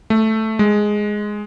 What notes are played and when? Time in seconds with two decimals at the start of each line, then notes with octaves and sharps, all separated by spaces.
0.10 A3
0.59 G#3